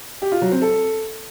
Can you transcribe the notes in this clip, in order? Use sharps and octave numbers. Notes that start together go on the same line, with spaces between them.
G4
F4
F#3
C4
A4